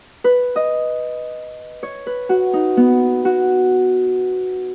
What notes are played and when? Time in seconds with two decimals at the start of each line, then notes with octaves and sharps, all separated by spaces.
0.24 B4
0.56 D#5
1.83 C#5
2.07 B4
2.29 F#4
2.53 D#4
2.77 B3
3.25 F#4